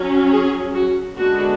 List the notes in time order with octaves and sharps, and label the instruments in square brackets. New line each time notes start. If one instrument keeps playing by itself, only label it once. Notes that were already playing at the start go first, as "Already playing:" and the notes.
Already playing: [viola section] F#3 C#4
G#4
F#4
D3 G#3 B3 D4 F#4